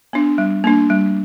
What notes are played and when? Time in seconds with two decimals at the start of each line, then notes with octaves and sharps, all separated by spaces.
0.13 B3 D4
0.38 G3
0.64 A#3 D4
0.90 G3